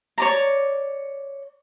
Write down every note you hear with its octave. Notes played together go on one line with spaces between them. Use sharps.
C#5 D5 A#5